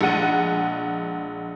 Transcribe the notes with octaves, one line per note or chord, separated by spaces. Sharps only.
A#1 G#3 F#5 D#7